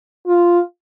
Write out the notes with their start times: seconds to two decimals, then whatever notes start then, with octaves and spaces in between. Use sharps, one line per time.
0.27 F4